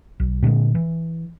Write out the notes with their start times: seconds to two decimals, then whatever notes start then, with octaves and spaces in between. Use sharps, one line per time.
0.20 B1
0.42 A#2 D3 D#3 G#3
0.75 E3